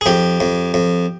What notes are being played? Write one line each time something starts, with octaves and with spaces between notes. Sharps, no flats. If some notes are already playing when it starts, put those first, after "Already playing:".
G#4
F2 G4
F2
F2